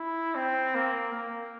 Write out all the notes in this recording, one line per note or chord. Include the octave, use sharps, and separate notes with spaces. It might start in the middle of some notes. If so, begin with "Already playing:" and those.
Already playing: E4
C4
A#3
A#3